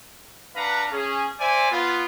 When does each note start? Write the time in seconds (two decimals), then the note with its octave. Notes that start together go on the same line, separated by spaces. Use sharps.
0.56 D4 B4 F5 F#5 A#5
0.91 C#4 G#4
1.40 C5 D5 E5 G#5
1.71 B3 F4